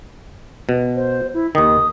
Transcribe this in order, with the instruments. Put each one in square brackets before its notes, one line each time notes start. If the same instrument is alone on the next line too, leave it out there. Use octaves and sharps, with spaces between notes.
[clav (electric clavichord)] B2
[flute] C5
E4
[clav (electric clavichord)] D#2 D#3 [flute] D#6